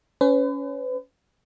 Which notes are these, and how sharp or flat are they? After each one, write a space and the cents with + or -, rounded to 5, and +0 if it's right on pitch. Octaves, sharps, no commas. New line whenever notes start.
C#4 +15 B4 +40